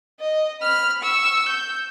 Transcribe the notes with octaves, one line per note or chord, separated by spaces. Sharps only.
D#5
B5 F6
C#6 E6
G6